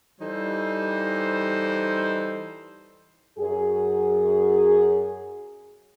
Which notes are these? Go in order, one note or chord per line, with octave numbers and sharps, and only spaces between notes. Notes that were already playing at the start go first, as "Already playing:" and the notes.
E3 G3 D#4 A4 C5
F#2 G#4